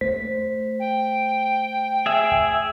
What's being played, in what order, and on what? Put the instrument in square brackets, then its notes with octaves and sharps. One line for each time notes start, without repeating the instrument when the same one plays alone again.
[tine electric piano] A3 C5 B6
[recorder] G5
[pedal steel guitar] G#4 E5